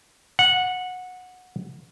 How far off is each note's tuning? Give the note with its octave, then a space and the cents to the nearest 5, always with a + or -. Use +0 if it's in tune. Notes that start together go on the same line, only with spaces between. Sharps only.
F#5 -15